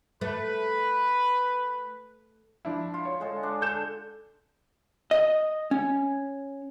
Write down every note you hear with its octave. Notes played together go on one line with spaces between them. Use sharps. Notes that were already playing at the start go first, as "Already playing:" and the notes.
A3 B4
F3 D4 E4
F4
C#5
D3 G#3 A5
D4
A4 G6 E7
D#5
C#4